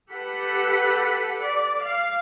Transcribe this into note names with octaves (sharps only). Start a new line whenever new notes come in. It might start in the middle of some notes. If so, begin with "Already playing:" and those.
G4 A4 B4 F#5 B5
D5
F5